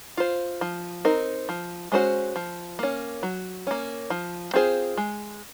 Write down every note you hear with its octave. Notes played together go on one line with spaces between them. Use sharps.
F4 C5
F3
C4 D#4 A#4
F3
G#3 C#4 F#4 C5
F3
A#3 C#4
F#3
A#3 C#4
F3
C4 F4 G#4 C5
G#3